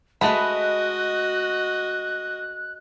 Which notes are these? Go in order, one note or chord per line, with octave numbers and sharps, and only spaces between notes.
G#3 A3 F#4 B4 D#5 F#5 B5 F#6